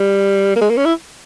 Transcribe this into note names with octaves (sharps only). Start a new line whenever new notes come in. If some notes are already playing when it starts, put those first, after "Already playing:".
Already playing: G3
A#3
G#3
A#3
C#4
E4